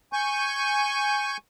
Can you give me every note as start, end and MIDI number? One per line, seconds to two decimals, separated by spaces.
0.13 1.37 80
0.13 1.37 85
0.13 1.37 91